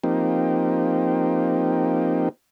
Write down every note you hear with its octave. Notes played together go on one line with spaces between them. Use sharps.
F3 A#3 C4 D#4 G4